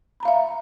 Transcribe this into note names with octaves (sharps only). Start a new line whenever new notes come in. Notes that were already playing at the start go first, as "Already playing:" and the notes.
E5 F5 A#5 B5